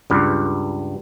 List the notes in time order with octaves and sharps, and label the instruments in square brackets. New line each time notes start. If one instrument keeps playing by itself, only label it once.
[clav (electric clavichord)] C#2 G2